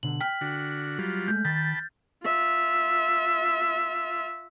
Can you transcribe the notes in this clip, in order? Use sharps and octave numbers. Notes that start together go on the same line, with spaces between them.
B2 D3 F#7
G5 F6 B6
D3 F#4
F#3 G3 F4
G#3 A3 G6
D#3 G5 A5 B5 A6
F4 E5